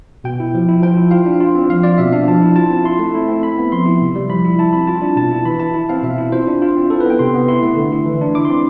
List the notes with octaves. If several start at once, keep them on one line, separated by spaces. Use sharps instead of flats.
B2 G5
E4
F3
E4
F3 G5
E4
F4 F5
D4
F4
C4
F3 F5
F4 D5
B2 E5
D4 F5
F3 A5
E4
F4 A5
C4
E4 C6
A3
E4
C4
E4 B5
B3
F3 C6
E4
C3
G3
F3 B5
E4
E4 A5
C4 B5
F4 A5
D4
B2 A5
E4
E3 B5
E4 A5
E4
C4 F5
B2 E5
E4
F4 C5
D4
F4
C4
E4 A4
B4
B3
G5
C3 C6
B3
E4 C6
A3
D3
E4
E3
D4
E4 D6
C6
C4